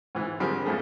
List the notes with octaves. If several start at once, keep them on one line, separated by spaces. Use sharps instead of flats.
G#2 E3
D3 F3 G3 C4 G#4 A#4
G#1 F2 A3 G#4